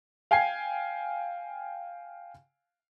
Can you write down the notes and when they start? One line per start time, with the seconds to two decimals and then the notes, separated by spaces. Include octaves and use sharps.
0.31 F5 G5 G#5 G#6 C7